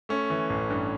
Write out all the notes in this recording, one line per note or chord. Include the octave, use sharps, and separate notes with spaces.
A3 C#4
E3
A1
G2